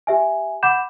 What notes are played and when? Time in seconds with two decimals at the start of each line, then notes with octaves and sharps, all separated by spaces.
0.07 G4 E5 G#5
0.63 F#5 B5 D6 G6 E7